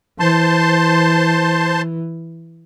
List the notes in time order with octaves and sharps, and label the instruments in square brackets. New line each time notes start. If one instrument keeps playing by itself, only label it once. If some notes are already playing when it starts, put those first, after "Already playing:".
[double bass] E3 [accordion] C5 A5 C6